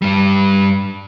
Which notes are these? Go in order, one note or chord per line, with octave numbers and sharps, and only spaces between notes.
G2 G3